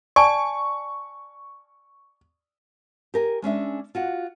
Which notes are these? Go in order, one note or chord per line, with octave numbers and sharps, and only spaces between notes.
D5 G#5 A5 C#6
G4 A#4 G#5
G#3 C#4 D4 E5
F4 F#4 F#5